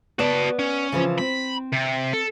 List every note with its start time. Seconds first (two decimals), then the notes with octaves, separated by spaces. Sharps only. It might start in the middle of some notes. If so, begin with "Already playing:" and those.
0.19 B3 F#4 B4 D5 A5
0.59 C#4
0.92 C#3 E3 F3
1.19 C4 B5
1.73 C3
2.14 A4